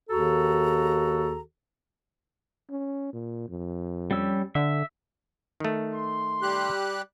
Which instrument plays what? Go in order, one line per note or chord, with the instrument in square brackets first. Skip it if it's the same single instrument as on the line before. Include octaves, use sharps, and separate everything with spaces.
[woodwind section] D#2 D#3 F#4 G#4 A4 A#5
[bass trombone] C#4
A#2
F2
[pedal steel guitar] G3 C#4 E6
[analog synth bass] D3 [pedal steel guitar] E5
[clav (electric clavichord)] D#3 A3
[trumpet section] C6
[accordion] G3 G4 F#6